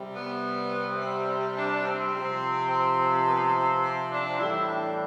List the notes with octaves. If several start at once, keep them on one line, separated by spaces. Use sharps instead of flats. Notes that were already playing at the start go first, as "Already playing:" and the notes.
Already playing: C3 G3
B3
C4
D4
C4
C3 F3
B3
C4
D4
A2 E3 G3 E4
D4